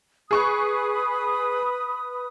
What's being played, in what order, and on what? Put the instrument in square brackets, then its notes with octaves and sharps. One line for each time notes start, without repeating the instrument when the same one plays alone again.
[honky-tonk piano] G#4 C#6 F#6 [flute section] B4 D#6